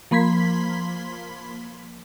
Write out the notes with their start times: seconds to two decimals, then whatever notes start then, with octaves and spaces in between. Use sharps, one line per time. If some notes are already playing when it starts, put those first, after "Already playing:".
0.11 F3 A#3 B5 C6 G#6 B6